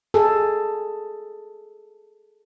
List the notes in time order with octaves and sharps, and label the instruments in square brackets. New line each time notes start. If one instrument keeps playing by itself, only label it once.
[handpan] G#4 A4